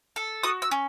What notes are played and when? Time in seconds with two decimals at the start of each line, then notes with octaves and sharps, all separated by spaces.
0.16 A4
0.43 F#4 D#6
0.62 E6
0.71 C#4